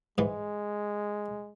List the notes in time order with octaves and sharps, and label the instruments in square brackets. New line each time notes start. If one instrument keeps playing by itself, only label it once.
[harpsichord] G#2 E3 [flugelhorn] G#3